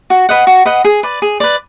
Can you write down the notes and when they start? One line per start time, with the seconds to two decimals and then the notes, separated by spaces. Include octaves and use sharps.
0.10 F#4
0.29 B4 D#5 F#5
0.47 F#4
0.65 B4 D#5 F#5
0.85 G#4
1.03 B4 D5
1.22 G#4
1.40 B4 D5